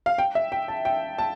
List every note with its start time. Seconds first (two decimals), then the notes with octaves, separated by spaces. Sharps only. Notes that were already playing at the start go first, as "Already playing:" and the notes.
0.06 F5
0.18 G5
0.35 E5
0.52 G5
0.68 A5
0.85 G5
1.18 A5